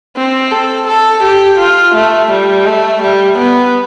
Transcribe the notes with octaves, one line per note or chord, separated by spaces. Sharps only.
C4
A4
A4
G4
F4
A3
G3
A3
G3
B3